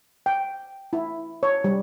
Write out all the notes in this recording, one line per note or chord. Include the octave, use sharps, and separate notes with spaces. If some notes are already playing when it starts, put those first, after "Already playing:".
G5
E4
C#5
G3